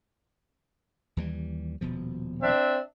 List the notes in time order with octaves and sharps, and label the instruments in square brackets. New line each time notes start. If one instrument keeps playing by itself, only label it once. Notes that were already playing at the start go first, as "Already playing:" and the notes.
[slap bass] D#2 E3 G3
D#1 B2 F3
[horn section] C4 D4 E5